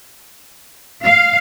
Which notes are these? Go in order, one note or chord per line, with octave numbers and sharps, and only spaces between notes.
F5